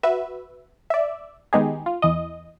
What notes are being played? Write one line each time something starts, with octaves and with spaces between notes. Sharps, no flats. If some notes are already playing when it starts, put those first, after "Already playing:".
F#4 B4 E5
D5 E5
D#3 G#3 B3 D#4 G4 G#4
F4
E2 E3 D#5